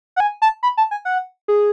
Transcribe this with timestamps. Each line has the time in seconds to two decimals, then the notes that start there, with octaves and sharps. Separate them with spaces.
0.16 F#5
0.20 G#5
0.42 A5
0.63 B5
0.77 A5
0.91 G#5
1.05 F#5
1.48 G#4